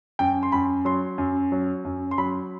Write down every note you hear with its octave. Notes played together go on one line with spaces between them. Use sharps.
F#2 G5
C6
F#2 B5
F#3 C6
F#2
F#3
F#2
C6
F#3 B5